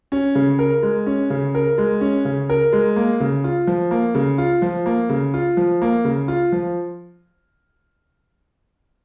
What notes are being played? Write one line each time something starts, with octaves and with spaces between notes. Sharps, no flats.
C#4
C#3
A#4
G#3
C#4
C#3
A#4
G#3
C#4
C#3
A#4
G#3
A#3
C#3
F4
F3
A#3
C#3
F4
F3
A#3
C#3
F4
F3
A#3
C#3
F4
F3